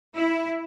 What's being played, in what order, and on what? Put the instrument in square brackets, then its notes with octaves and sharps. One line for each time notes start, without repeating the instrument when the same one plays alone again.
[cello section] E4